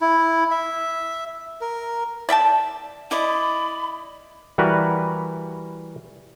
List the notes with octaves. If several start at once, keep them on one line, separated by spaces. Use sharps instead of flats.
E4
E5
A#4
D5 E5 G5 A5
E4 D5 D#5 B5
E3 G3 F#4 A#4 B4